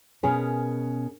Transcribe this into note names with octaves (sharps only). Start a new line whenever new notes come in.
B2 C#4 G#4 A#4 B4